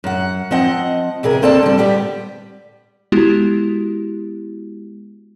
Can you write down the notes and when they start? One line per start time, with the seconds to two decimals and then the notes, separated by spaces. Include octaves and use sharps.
0.04 F#2 F#5
0.51 F3 C4 D#5 F#5
1.23 E2 C3 G#4 A#4
1.42 A#3 C4 A4 D5 A5
1.63 D3 G3
1.78 G3 B3 G4
3.12 G#3 B3 E4 F#4 G4